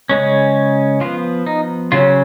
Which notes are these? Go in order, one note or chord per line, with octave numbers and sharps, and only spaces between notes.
C#3 G#3 C#4
F3 B3 F4
D#4
C#3 F#3 C#4 F4